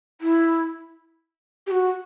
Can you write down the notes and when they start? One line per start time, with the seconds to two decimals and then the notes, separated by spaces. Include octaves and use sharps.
0.21 E4
1.67 G4
1.71 F#4